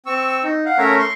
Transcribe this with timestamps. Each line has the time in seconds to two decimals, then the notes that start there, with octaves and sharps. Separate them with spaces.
0.06 C4 C#6 E6
0.44 D#4
0.65 F5 F#5
0.78 A3 C#4 A#4 C#5 E5 A#5
0.99 C6 C#6